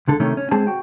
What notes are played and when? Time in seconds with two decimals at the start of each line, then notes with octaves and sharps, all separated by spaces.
0.08 C#2 D3 A4
0.20 C3 D#3 A3 C#4
0.37 C#4
0.51 G#3 C4 G#4 C5 G#5 A5
0.67 F#4 G5